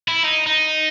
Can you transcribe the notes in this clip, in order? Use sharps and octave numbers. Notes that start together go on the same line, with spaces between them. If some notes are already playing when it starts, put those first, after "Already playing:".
E4
D#4
D#4